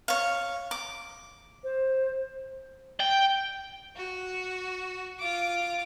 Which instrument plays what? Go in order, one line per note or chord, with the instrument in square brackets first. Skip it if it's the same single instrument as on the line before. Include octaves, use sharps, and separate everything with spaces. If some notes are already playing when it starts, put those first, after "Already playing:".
[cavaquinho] C#5 F5
D6
[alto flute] C5
[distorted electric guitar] G5
[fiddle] F#4
F4 D6